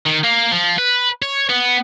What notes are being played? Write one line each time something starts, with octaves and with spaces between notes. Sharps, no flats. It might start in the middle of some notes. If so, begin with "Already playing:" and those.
D#3
A#3
F3
B4
C#5
B3